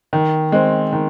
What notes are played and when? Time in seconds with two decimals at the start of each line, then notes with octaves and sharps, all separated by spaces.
0.13 D#3
0.52 G#3 C4
0.93 D#3